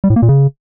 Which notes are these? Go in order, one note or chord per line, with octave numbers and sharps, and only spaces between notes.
G3
A2
A#3
A#2
C#3